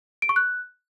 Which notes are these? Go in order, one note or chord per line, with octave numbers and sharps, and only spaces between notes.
D7
C#6
F#6